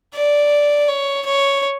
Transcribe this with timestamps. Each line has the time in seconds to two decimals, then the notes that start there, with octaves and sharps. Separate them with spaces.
0.14 D5
0.88 C#5
1.25 C#5